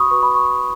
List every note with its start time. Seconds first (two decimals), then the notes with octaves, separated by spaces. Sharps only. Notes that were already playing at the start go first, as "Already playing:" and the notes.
Already playing: F#4 B4 B5 C#6 D#6
0.11 F#4 B4 C#6
0.23 B5
0.34 C#6